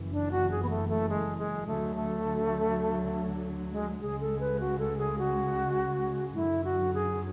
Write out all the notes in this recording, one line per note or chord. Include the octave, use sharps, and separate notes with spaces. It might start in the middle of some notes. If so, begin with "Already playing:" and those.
Already playing: F#1 F#2 E3
D4
F#4
G#4
B3
A3
A3
G#3
G#3
D2 D3 F#3 A3
A3
G#3
C#2 C#3 G#3 G#4
A4
B4
F#4
A4
G#4
F#4
F#2 D3 F#3 E4
F#4
G#4